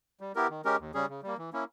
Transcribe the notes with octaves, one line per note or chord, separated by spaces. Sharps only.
G3
B3 E4 G4 A#4
D#3
G#3 C#4 G4 A#4
D#2
C#3 G3 C#4 G#4
C#3
G3 A#3
E3
A#3 C#4 E4